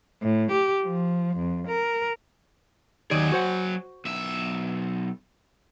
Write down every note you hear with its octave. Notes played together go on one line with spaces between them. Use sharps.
A2
G4
F3
F2
A#4
D#2 D#3 F#3 G#4 D5
F#4 C5 F#5
B1 E5